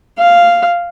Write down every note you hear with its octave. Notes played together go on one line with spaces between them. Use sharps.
F5